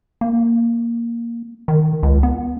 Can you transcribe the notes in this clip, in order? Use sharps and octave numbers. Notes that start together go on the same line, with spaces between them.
A#3
D#3
C#2
B3